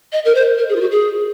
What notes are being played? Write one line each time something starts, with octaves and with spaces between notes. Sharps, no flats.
D#5
A#4
C5
A#4
G#4
F4
F#4
G#4